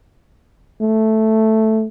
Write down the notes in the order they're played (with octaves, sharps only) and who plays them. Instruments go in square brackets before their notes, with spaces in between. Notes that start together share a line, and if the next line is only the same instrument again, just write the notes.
[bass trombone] A3